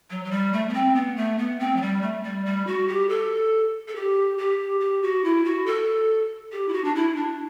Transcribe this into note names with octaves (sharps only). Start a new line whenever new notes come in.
F#3
F#3
G3
A3
B3
C4
B3
A3
B3
C4
F#3
G3
A3
G3
G3
F#4
G4
A4
A4
G4
G4
G4
F#4
E4
F#4
A4
G4
E4
F#4
D4
E4
D4